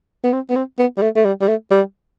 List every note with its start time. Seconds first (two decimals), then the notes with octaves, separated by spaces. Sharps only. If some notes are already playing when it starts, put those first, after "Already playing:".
0.24 B3
0.33 C4
0.50 B3
0.56 C4
0.79 B3
0.97 G3
1.02 A3
1.16 A3
1.25 G3
1.41 G3
1.48 A3
1.71 G3